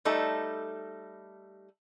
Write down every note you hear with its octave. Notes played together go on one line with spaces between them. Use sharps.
G3 A3 D#4 A4